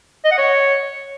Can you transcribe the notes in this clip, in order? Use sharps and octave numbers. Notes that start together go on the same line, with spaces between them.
D#5
F#5
C#5